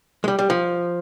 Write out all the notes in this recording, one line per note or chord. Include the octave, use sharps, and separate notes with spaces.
G#3
G3
G3
F3